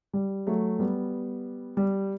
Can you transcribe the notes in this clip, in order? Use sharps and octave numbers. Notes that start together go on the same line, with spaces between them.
G3
F#3 A3
G3 B3
G3